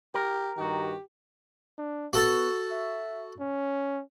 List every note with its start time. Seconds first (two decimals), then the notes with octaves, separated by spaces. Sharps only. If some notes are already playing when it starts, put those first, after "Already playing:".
0.14 G4 A#4
0.58 G2 D#3 F#4 G4
1.78 D4
2.13 B3 F#4 A4 A5
2.71 E5
3.40 C#4